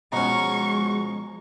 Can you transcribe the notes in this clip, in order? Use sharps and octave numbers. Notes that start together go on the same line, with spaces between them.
B2 F3 G#3 C#4 A#5 C#6